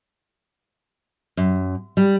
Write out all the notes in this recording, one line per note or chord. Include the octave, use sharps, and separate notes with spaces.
F#2
G3